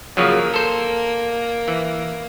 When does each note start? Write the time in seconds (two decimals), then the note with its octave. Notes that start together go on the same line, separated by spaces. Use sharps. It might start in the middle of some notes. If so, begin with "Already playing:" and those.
0.17 C#3 F3 F#3 A#3
0.54 A4 C5
1.68 E3